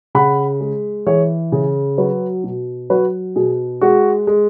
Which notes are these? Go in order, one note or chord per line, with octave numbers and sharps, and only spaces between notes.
C#3 F#5 B5
G#3
E3 G#4 C#5
C#3 G#4
F#3 F#4 B4
B2
F#3 F#4 B4
B2 G#4
G#3 F#4
G#3